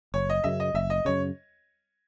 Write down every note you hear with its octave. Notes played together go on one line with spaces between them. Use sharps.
F#1 C#5
D#5
F#2 C#3 E5
D#5
F#1 E5
D#5
F#2 C#3 C#5